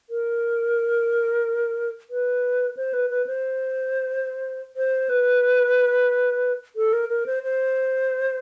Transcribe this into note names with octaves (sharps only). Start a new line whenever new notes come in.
A#4
B4
C5
B4
B4
C5
C5
B4
A4
A#4
A#4
C5
C5